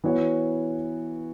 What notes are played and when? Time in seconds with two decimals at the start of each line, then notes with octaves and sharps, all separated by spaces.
0.04 E3 B3 F#4 C#5